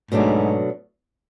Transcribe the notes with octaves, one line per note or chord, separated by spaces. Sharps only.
G#2 B2 F#3 A3 D4